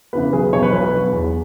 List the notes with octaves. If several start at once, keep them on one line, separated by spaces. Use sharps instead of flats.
C#3 E3 B3 B4
B1 G#4
B2 F#3 C#5
B4
B1
B2 F#3
E2